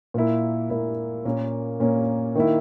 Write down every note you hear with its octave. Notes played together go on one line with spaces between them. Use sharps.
A#2 A#3 E4
A#2 A#3 E4
A#2 A#3 C#4
A#2 A#3 C#4
D#3 A#3 E4